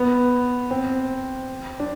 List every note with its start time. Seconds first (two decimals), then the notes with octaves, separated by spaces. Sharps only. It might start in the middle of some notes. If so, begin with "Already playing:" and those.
Already playing: B3
0.71 C4
1.80 D4